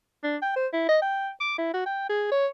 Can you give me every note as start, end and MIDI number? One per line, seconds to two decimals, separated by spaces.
0.23 0.37 62
0.42 0.55 79
0.56 0.67 72
0.73 0.84 64
0.88 0.99 75
1.02 1.30 79
1.40 1.56 86
1.58 1.72 64
1.74 1.83 66
1.86 2.04 79
2.10 2.31 68
2.32 2.47 73